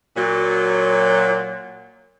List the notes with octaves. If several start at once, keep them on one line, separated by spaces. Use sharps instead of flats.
A#2 F#3